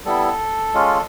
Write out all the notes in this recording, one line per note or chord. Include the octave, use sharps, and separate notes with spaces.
G3 B3 E4 A4
G#3 C#4 F4